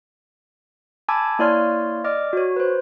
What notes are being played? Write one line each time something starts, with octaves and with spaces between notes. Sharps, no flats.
G#5 A5 B5 D6 E6 G#6
A#3 E4 C#5 D5 C6 F6
D5 D#5 D6 F6
F#4 C#5
B4 C5